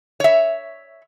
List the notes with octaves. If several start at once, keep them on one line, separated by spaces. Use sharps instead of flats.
C#5 E5